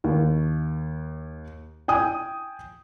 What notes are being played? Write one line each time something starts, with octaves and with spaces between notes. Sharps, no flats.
D#2
G5 G#5 D#6